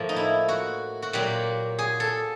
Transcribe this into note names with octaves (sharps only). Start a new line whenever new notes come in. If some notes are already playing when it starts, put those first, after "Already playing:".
Already playing: A2 F3 A#3
D#4
E4
F#4
F#4
A#2 F#3 A#3 G4
G#4
A4